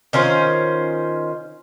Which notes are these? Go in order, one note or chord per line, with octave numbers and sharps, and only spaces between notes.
D#3 C#4 F4 C5